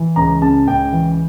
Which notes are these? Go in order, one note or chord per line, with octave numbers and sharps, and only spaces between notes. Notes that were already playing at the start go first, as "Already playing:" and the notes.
Already playing: E3
C#2 A#5
C#3 A5
C#2 G5
E3